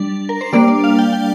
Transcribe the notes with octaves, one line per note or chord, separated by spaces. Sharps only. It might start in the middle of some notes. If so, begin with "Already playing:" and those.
Already playing: G3 D4
A#4
C5
G3 A#3 D4 D5
D5
F5
G5
G5